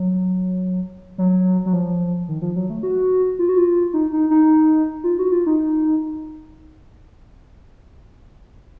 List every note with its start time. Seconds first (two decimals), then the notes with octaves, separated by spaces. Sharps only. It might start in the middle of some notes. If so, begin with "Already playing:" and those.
Already playing: F#3
1.18 F#3
1.66 F#3
1.73 F3
2.28 D#3
2.42 F3
2.56 F#3
2.70 A3
2.83 F#4
3.39 F4
3.49 F#4
3.58 F4
3.93 D#4
4.12 D#4
4.31 D#4
5.04 F4
5.19 F#4
5.32 F4
5.46 D#4